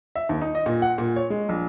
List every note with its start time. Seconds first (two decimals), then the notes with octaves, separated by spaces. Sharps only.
0.15 E5
0.29 D#2
0.42 D#4
0.55 D#5
0.66 A#2
0.82 F#5
0.98 A#2
1.16 C#5
1.30 G#3
1.49 A#1